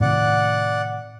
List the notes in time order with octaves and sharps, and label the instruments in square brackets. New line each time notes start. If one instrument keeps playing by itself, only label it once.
[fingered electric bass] A2 C3 D#3 [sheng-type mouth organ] D5 F#5